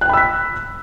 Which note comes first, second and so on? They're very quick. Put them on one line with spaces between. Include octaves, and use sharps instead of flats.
F#6 G5 B5 E6 B6